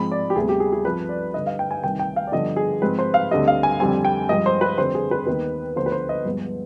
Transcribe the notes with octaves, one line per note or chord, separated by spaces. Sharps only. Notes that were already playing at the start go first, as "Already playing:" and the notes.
Already playing: G#2 F3 G#3 C4 B5
D5
G4
D2 C3 G3 B3 G#4
G4
G#4
G#4
G2 F3 C4 B4
D5
G2 D3 G3 D#5
F5
G5
G#5
C2 C3 D#3 G5
G5
F5
D5
G2 D3 F3 B3 D#5
G#4
G#2 F3 G#3 C4 B4
C5
F5
D2 D3 G3 C4 D#5
F5
G#5
F2 D3 G3 C4 G#5
G5
G2 F3 G#3 D#5
C5
B4
F2 D3 G3 C4 C5
G#4
B4
D#2 D#3 B3 B4
D2 D3 F3 B3 C5
B4
C5
D#5
G2 F3 G#3 B3